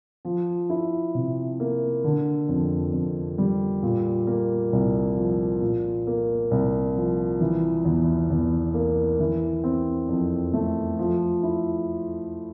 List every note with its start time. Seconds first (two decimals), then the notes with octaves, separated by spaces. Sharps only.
0.25 F3
0.70 E4
1.14 C3
1.60 A#3
2.04 D3
2.49 F2
2.93 F2
3.38 G3
3.83 A#2
4.27 A#3
4.73 C2
5.17 F3
5.61 A#2
6.07 A#3
6.51 C2
6.96 F3
7.40 E3
7.85 E2
8.30 E2
8.74 A#3
9.19 E3
9.64 C4
10.09 F2
10.54 A3
10.99 F3
11.43 E4